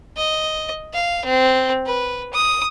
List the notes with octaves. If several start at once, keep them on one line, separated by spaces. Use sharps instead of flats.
D#5
F5
C4
B4
D#6